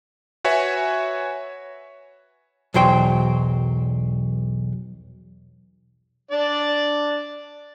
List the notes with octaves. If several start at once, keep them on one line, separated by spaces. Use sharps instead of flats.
F#4 B4 C#5 E5 G#5
B1 E2 F#3 C5 G5
D4 D5